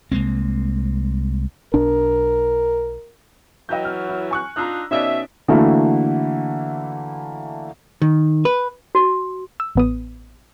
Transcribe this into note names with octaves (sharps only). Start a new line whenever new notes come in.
C2 G#3 A#3 C4
B1 D4 A#4
E3 F#3 D#5 G5 G6
F6
E4
G#5 C#6 F#6
D4 D#4 F4 A#5 E6 F#6
B2 C#4 D#4 D5 E5
D3 E3 A3 A#3 E4 F#4
D#3
B4
F#4
E6
A1 B3 D#6